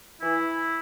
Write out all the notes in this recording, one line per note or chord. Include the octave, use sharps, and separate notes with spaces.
E3 E4